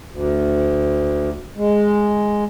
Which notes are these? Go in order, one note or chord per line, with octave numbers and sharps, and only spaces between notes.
D2
G#3